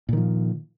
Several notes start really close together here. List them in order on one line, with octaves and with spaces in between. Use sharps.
A#2 D#3 F3